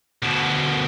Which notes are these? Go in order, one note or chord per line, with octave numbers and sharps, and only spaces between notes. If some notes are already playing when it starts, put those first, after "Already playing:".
D2 B2